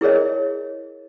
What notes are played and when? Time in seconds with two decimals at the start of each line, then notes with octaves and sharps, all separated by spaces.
0.01 E4 G#4 A#4 C#5 D#5